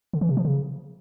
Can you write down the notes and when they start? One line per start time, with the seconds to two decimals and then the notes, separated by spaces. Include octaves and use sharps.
0.13 D3
0.21 E3
0.29 C3
0.37 F3
0.45 C#3